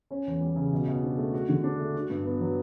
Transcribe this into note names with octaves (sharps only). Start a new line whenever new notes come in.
C#4
E2
G3
C#3
B2
B2
D4
A3
F#4
D3
D4
A3
F#4
G2
B3
F#3